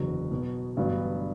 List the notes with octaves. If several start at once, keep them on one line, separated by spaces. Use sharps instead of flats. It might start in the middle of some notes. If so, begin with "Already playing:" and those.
Already playing: F#1 E2 D3 F#3
B2 F#3 B3
A1 G2 D3 F#3 B3